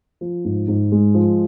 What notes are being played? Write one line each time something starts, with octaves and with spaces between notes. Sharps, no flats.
F3
G#2
G#2
G#3
F3